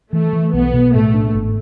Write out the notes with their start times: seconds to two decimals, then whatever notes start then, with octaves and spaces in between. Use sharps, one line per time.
0.13 E3 A3
0.33 E3
0.53 B1 B3
0.73 B2
0.95 A2 A3
1.14 D4
1.35 G#1